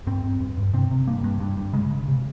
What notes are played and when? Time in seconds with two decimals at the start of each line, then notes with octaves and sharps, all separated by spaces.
0.07 G2 C4
0.24 G2
0.40 G2
0.57 G2
0.74 C3 C4
0.91 C3
1.07 G2 A#3
1.24 G2
1.40 G2
1.57 G2
1.73 C#3 G#3
1.91 C#3
2.08 C3